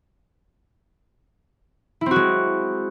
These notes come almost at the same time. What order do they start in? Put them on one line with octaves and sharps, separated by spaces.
E4 C4 F#4 G#3